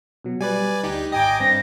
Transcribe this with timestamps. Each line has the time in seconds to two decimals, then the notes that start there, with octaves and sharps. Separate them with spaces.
0.24 B2 F#3
0.41 G3 B4 D5 G#5
0.83 D2 D#4 G4
1.12 G#1 D#5 G5 G#5 A#5 D6 A#6
1.40 G2 C4 A#6